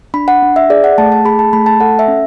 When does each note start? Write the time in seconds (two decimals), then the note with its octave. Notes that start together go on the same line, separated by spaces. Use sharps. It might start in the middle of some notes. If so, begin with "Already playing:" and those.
0.14 D4 B5
0.28 F#5
0.42 D4
0.56 E5
0.70 G#4 D5
0.84 F#5
0.98 A3 A5
1.12 A5
1.25 G#4 B5
1.39 A5
1.53 A3 B5
1.66 A5
1.80 A4 F#5
1.99 E5
2.08 C#4